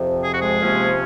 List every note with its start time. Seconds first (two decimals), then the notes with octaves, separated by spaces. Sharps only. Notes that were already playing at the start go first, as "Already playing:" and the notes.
Already playing: F2 C3 F3
0.24 G#4
0.33 F#4
0.41 G#3 G#4
0.62 C3 F3 A#3 C#4